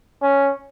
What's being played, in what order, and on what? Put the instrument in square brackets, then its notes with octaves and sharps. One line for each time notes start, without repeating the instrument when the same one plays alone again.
[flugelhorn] C#4